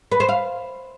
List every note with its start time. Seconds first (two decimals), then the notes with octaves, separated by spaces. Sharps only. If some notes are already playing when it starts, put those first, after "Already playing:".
0.12 B4
0.20 C5
0.29 F5